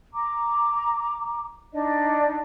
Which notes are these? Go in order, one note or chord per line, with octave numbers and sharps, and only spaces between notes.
A#5 D6
D4 D#4 D5 D#5